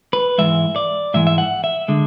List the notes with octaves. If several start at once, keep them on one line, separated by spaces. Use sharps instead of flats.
B4
G#2 E3 G#3 E5
D5
G#2 E3 G#3 E5
E5
F#5
E5
D3 G#3